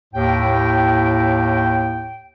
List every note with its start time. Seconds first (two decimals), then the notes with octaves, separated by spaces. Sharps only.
0.14 D#2 A2 G5